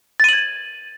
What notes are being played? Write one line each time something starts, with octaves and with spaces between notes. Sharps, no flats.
G#6 A6 D#7 F#7